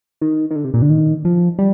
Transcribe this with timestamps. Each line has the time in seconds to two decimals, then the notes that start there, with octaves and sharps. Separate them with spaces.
0.21 D#3
0.51 D#3
0.56 D3
0.64 C3
0.74 A#2
0.82 D3
0.90 D#3
1.25 F3
1.59 G3